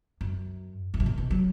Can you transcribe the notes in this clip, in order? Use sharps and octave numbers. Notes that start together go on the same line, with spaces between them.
F#2
F#2
B2
A#2
B2
F#3